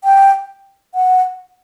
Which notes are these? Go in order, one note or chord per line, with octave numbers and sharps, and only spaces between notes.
G5
F#5